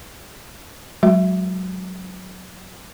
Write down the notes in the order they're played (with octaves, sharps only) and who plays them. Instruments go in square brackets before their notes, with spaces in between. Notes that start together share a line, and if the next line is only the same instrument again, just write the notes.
[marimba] F#3 G#3 F#4 E5